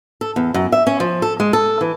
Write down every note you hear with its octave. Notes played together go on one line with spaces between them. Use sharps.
A4
E2
F#2
E5
C#4
F3
A4
G#3
A4
E3